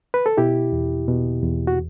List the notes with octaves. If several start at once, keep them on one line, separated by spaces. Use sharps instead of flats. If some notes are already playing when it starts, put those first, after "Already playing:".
B4
A4
B2 E4 G4
E2
B2
E2
F#4